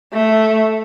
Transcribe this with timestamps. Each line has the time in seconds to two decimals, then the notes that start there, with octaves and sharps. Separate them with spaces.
0.13 A3